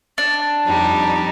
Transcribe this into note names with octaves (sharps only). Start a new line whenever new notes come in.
D4
F2 G3 D#4